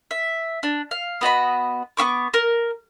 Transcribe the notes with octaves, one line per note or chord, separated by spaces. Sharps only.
E5
D4
F5
B3 F#4 D#5 B5
B3 E4 C#6 D6
A#4